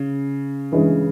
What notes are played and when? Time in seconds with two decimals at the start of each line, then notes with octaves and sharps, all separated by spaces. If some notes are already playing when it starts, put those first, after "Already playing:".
Already playing: C#3
0.72 G2 E3 G#3 C#4